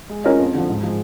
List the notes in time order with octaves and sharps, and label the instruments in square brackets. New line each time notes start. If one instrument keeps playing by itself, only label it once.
[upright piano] G#3
C#4 F4 A#4 D#5
F2
D3 F3
G#2
F3 G#3